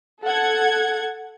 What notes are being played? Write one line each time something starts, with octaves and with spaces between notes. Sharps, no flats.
A4 F#5 G#6